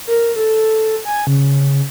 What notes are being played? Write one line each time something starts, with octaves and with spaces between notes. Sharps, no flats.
A#4
A4
G#5
C#3